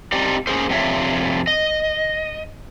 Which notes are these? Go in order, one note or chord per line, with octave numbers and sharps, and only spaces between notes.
C4 D4 D#4 G4 D5
A#3 C#4 G#4 A#4 C5
F2 C3 D4 F4 C#5 E5
D#5